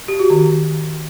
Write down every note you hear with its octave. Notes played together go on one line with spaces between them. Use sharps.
G4
F#4
D#3